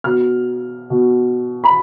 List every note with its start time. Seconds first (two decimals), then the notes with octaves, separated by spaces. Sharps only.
0.04 B2 F6
0.90 B2
1.64 B5